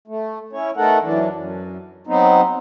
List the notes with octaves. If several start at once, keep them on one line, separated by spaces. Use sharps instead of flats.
A3
C#4 E4 C#5
A3 B3 D#4 A4 A#4 F#5
F#2 E3 D4
F#2
F#3 B3 C4 D#4